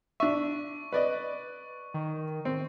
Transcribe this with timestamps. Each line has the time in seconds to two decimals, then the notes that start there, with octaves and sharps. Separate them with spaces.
0.20 D4 E5 C#6
0.93 B4 D5 D#5
1.94 D#3
2.45 C4